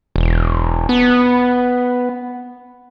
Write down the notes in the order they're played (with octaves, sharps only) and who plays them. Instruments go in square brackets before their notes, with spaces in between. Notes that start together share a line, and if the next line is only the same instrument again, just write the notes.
[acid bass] E1
B3